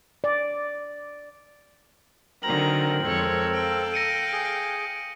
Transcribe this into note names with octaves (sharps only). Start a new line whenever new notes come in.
D5
D3 D#3 F#3 C4 A#4 A#5 F#7
F2 G#3 A4 C#5
F5 G5
A#6 C#7 D#7
G#4 A#6